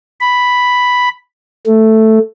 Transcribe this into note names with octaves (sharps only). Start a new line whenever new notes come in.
B5
A3